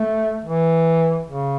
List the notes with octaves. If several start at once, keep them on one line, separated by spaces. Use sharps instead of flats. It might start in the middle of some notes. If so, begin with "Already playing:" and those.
Already playing: A3
E3
C#3